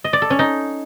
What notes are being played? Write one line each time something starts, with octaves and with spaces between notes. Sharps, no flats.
D#5
D5
A4
C#4
D#4